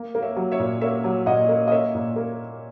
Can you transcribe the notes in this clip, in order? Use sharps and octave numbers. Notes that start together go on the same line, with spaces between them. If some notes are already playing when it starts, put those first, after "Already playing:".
Already playing: A#3
A#3
C#5 E5
F#3
C#5 E5
A#2
A#3 C#5 E5
F#3
A#2 D#5 F#5
A#3
D#5
A#3 C#5 E5
A#2
A#3